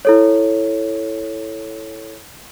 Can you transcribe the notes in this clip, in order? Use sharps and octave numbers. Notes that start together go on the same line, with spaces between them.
E4 A4 C#5